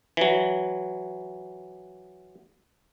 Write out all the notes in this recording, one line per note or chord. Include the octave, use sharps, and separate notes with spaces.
E3 F#3